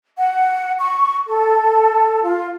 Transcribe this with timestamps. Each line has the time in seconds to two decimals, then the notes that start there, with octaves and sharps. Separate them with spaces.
0.18 F#5
0.80 C#6
1.28 A4
2.23 F4